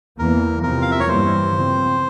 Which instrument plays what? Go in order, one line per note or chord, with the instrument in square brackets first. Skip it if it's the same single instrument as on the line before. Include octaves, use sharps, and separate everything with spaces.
[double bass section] E2 E3 A#3 [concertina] A#4
[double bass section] E2 C3 F3 C4 [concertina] A#4
[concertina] F5
E5
C#5
[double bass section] G2 E3 G3 A#3 [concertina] C5
[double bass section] C#3 F3 C4